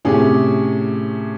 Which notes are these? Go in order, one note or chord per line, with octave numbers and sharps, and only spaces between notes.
A2 C3 C#4 G4 G#4